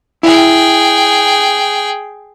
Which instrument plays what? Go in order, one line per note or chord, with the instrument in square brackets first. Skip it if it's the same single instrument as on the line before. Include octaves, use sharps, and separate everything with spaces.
[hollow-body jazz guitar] E4 [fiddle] G#4 G5